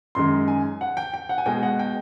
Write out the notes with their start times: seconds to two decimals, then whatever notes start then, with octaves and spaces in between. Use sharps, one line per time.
0.15 F#2 D#3 G#3 C6
0.48 G#5
0.81 F#5
0.97 G5
1.14 G5
1.29 F#5
1.38 G#5
1.46 B2 G#3 G5
1.63 F#5
1.79 G5